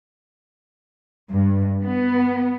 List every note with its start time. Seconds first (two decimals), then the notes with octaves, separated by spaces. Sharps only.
1.31 G2
1.83 B3